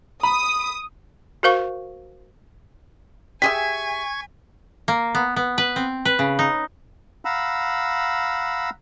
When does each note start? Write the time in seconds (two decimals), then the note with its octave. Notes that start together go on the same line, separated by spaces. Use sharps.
0.23 B5 D#6
1.43 F#4 A#4 C5 F5 C#6
3.42 G4 G#4 E5 G#5 C#6 G#6 B6
4.88 A#3
5.15 B3
5.36 B3
5.58 B4
5.76 C4
6.05 B4
6.19 C#3
6.39 D#4
7.25 F5 F#5 A#5 B5 E6